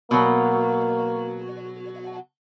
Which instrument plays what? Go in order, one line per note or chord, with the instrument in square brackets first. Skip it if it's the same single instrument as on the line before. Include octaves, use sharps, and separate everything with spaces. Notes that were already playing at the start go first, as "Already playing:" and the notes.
[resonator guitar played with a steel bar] B2 F#3 [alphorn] A#3